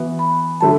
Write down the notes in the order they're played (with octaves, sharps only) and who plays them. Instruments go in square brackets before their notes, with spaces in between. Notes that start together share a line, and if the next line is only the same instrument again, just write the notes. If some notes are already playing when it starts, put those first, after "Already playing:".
Already playing: [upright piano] E3 B3 F#4
[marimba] B5
[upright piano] D3 F#3 A3 [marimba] A5